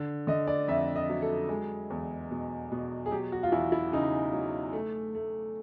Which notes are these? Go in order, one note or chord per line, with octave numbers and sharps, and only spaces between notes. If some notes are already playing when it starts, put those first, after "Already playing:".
Already playing: D3
D3 D#5
D5
F2 E5
D#5
F#3
A4
G#3
E2
B2
B2
G#4
F#3 G4
F#4
F4
E2 E4
E4
C#3 D#4
F#3
A3
A3